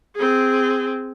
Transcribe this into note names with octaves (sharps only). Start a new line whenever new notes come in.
C4 G#4